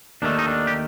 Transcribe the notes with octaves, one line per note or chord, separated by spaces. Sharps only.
D#2 D#3 A3 D4
D#4
D4
G4